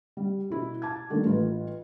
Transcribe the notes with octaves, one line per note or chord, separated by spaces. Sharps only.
G3
B2 E4
A5 D6 G#6
D#3 G3 A3 A#3 D4
A1 F4 B4